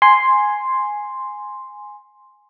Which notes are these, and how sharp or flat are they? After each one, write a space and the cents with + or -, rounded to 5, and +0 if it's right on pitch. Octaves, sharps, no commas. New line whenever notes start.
G#5 +0 C6 +0